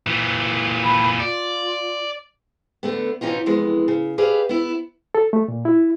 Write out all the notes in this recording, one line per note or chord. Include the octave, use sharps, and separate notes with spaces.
A#2 E3
B5
F4 D5
D3 A3 B3
B2 E3 C#4 D#4 F4
F2 E3 G#3 B3
C#3
G4 G#4 B4 D5 E5 F5
B3 E4
A4
A3
A#2
E4